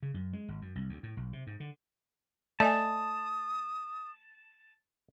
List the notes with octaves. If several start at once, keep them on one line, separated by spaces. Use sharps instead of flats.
C#3
F#2
G#3
G#1
F#2
C2
D2
A2
B1
C3
G#2
D3
A3 D5 D#5 G#5 A5 D#6